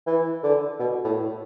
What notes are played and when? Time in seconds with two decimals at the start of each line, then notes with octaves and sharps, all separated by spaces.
0.07 E3
0.43 D3
0.80 B2
1.05 A2